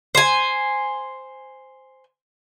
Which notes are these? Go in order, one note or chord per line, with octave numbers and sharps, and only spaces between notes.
C5 G#5